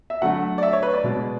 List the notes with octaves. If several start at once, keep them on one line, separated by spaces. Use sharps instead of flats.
E5
D3 F#3 A3 F#5
D5
E5
C#5
B4
D5
B2 G#3 B3